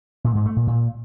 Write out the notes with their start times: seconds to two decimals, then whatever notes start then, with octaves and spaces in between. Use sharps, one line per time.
0.24 A#2
0.35 G#2
0.46 A3
0.56 A#2
0.67 A#2